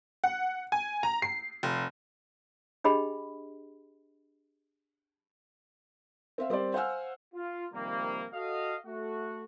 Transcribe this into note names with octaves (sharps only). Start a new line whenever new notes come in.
F#5
G#5
A#5
C7
F1
D4 G4 G#4 D#5 G5 B5
C4 E5 F5
G3 C4 G4 A#4 C5 D5
C5 F5 F#5 G#5 E6 F6
F4
C3 D#3 F3 G3 A#3
F#4 A4 D#5 F5
A3 F#4